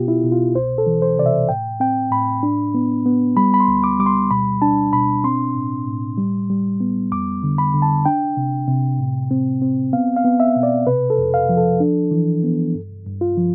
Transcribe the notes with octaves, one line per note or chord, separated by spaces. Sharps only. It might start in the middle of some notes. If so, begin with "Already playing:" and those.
Already playing: B2 B3 F4 G4
E4
B2
F4
C2 C5
A4
E3
C5
C3 D5
E5
A2 G5
C4 G5
A2 B5
D4
B3
B3
G3 B5
B5
C6
D2
D6
G3 D6
C6
B2 B5
D4 A5
B2 B5
C4 C6
A2
A2
G3
G3
B3
F2 D6
D3
B5
D3
A5
D4 G5
C3
C3
A2
C4
C4
B3 F5
F5
B3
E5
B2
D5
C3 B4
A4
F2
F5
F3
A4
D4
E3
B3
G2
G2
F4
F3